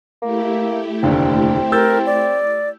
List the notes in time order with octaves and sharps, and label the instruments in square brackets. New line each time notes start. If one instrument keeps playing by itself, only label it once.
[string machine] A3 E4 G4 [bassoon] A#3
[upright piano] F1 D#2 D3 [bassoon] C4
[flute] A#4 [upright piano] E6 G6 A6
[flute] D5